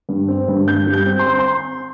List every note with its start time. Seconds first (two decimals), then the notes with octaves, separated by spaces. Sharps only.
0.09 G2
0.28 C4
0.48 G2
0.67 G2 G6
0.87 G3
0.94 G6
1.06 C4
1.19 C6
1.26 C4
1.39 C6